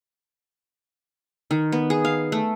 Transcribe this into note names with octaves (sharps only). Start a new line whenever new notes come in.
D#3
B3
G#4
F5
A3